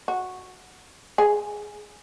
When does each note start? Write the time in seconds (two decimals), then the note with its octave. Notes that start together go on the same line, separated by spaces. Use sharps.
0.08 F#4
1.18 G#4